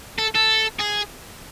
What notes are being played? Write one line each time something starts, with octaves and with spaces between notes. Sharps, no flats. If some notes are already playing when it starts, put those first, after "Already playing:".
A4
A4
G#4